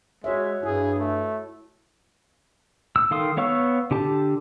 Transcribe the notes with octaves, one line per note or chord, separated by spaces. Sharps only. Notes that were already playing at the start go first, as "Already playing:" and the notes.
G#3 F#4 C#5 E5
G2 E4 G#4
A3
E6
D#3 A4 F5 C6 D#6
B3 C#5 F5 C#6 E6
D3 G4 A5